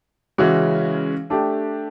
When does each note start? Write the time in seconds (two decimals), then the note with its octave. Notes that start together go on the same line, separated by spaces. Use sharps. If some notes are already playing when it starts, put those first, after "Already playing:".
0.38 C#3 E3 G#3 C#4 F#4
1.30 A3 D4 G4